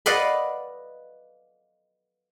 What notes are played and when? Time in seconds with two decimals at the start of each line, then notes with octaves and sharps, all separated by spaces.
0.06 B4 D5 D#5 F5 F#5 B5